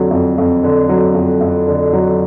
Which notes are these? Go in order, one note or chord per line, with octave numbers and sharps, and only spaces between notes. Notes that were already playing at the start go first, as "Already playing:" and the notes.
Already playing: F2 D3 F#3
F2
F2
D3
F#3
F2
F2
D3
F#3